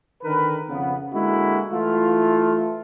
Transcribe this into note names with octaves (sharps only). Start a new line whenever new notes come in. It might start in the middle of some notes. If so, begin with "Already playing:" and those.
D3 D#3 A#4 B4
F2 C#3 B3
D3 G#3 A#3 E4 F#4
E3 A3 E4 F4